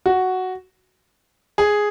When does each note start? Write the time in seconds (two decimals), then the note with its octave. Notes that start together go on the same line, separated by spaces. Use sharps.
0.06 F#4
1.58 G#4